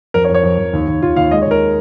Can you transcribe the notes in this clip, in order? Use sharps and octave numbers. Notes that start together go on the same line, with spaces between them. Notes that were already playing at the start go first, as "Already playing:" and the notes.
F2 A#4
C#5
F2
C#5
F2
F2
D#2
D#2
D#2 F4
D#2 F5
G#3 D#5
C#5
D#2
A#4